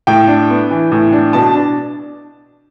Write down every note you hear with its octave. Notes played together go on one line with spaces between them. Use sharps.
A2 G5
D4
B3
E3
A2
D4
B2 A5
D4